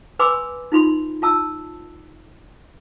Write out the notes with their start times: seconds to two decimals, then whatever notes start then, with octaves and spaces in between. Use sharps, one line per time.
0.19 B4 G#5 B5 C6 D6 E6
0.72 D#4 F4 B5 C6
1.22 F4 A5 E6